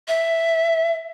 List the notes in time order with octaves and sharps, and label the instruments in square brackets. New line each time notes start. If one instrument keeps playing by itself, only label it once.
[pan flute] E5